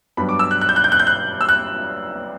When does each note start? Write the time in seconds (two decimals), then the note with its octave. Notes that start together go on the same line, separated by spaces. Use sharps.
0.17 G2 F#3 B3 D4 B5
0.29 D6
0.39 E6
0.51 F#6
0.61 F#6
0.69 G6
0.76 F#6
0.84 G6
0.92 F#6
0.99 G6
1.07 F#6
1.41 E6
1.49 F#6